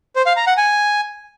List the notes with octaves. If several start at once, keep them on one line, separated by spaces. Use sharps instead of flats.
C5
F5
A#5
F#5
G#5